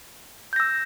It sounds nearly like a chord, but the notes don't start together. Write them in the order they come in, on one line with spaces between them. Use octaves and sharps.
G6 A#6 E6